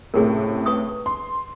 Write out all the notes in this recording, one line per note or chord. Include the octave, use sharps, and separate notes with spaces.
C#2 A2 C3 G#4 A#4
B4 C#6 D#6
C6